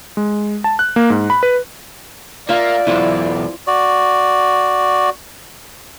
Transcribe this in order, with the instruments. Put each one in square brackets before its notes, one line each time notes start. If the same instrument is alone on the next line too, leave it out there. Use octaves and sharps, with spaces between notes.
[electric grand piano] G#3
A5
F#6
A#3
G#2
B5
B4
[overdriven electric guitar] A#3 [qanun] F4 E5 [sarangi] D5
[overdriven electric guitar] B1 E2 [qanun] E4 F4 C5
[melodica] F#4 D5